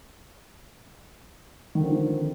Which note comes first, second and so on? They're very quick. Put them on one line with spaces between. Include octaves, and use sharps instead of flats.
D#3 D3 F3 C4